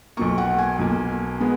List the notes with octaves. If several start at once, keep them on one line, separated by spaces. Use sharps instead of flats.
B1 B2 A#3 C#6
F#5
G#5
B1 B2 A#3
G#3 B3